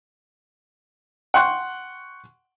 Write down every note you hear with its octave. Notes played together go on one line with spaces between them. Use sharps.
F#5 G5 C6 C#6 F#6